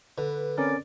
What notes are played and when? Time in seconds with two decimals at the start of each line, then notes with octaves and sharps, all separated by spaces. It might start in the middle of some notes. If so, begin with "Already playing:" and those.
0.18 D3 B4
0.58 C4 C#4 A#4 D5